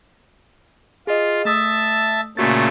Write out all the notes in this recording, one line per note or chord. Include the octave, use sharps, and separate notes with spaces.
F4 G#4 D#5
A3 E5 A5 D#6 E6
A#2 C#3 A3 F#4 A6